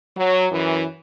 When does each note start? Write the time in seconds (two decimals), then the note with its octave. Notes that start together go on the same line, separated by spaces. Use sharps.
0.15 F#3
0.51 F#2 E3